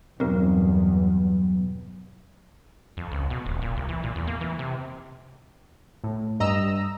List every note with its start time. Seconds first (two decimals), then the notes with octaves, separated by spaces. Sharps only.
0.20 B1 E2 G2 C4 A#4
2.97 F2
3.12 C#2
3.30 B2
3.46 D#1
3.62 A#2
3.77 C2
3.89 E3
4.03 A#2
4.16 E2
4.27 A#3
4.41 E3
4.59 C3
6.04 A2
6.40 G2 D#5 A#5 E6